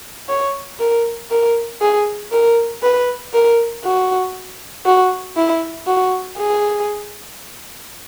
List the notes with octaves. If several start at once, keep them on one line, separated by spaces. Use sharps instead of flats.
C#5
A#4
A#4
G#4
A#4
B4
A#4
F#4
F#4
E4
F#4
G#4